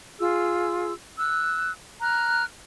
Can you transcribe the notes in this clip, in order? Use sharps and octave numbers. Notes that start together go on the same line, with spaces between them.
F4 G#4 E6
E6 F#6
A#5 F6 F#6